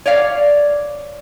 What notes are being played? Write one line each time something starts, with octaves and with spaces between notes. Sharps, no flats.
C#5 D5 F5